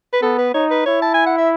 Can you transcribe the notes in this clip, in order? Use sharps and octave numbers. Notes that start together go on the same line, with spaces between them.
B4
B3 A4
B4
D#4 C#5
B4
E4 C#5
A5
G#5
F#5
E5